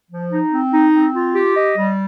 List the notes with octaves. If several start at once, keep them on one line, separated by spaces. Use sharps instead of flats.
F3
D#4
C4
D#4
C4
F4
G4
D#5
G3